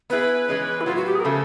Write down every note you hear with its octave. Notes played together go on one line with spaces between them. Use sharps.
B3 E4 G#4 B4
E3 G#3 C#4
E4
A2 F#3 B3 F4
F#4
G4
G#4
A#4
C#3 F3 A3 A4